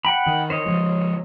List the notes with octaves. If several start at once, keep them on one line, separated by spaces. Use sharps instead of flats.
F#5 G5 B5
D#3
C5 C#5 D#5
F3 G#3